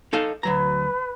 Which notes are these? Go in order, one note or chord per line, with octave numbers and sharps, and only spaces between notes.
D#4 A4 F5
D2 F#3 B4 A#5